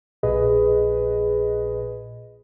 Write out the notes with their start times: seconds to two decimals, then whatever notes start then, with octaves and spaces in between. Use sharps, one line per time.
0.23 A#1 A#2 G#4 B4 D#5